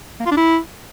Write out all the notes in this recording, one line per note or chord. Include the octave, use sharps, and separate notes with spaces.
A#3
F4
D4
E4